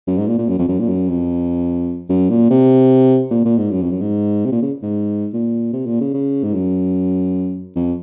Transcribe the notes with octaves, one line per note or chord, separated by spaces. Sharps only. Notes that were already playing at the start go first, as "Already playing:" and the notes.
F#2
G#2
A#2
A#2
F#2
F2
F#2
A#2
F#2
F2
F#2
A#2
C3
A#2
A#2
G#2
F#2
F2
F#2
G#2
C3
A#2
C#3
G#2
A#2
C3
A#2
C#3
C#3
G#2
F#2
F2